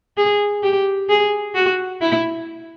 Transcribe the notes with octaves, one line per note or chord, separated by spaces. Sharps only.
G#4
G4
G#4
F#4
E4